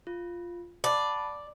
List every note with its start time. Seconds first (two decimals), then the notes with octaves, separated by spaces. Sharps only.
0.07 F4
0.84 D5 F#5 A5 B5